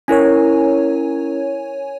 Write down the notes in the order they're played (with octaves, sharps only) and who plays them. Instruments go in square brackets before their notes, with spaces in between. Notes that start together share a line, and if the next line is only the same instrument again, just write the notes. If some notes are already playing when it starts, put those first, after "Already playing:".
[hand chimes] C#4 E4 A#4 [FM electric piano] C#5 G#5